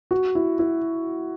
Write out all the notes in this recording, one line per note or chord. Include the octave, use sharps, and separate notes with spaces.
F#4
E4
E4